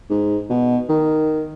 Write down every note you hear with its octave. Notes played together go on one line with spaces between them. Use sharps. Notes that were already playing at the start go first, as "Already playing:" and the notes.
G#2
B2
D#3